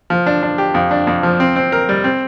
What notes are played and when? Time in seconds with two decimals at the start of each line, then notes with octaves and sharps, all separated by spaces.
0.10 F3
0.26 D4
0.43 D4
0.58 G4
0.74 F2
0.91 D4
1.07 F2
1.23 F3
1.40 C4
1.56 C4
1.72 A#4
1.89 G3
2.04 C4